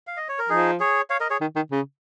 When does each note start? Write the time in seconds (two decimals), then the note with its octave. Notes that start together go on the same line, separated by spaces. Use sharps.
0.07 F5
0.17 D#5
0.29 C#5
0.39 A#4
0.49 F3 D#4 G#4
0.80 G#4 C#5
1.10 C#5 F5
1.20 A#4 D#5
1.30 G#4 C#5
1.41 D#3
1.55 D#3
1.71 C#3